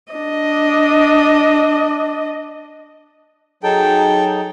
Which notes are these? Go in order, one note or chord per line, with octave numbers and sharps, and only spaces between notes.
D4 D#5
F#3 D#4 G#4 A4 G5